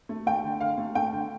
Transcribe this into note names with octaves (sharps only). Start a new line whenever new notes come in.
A3
A3 G5
D3
D3 F5
A3
A3 G5
D3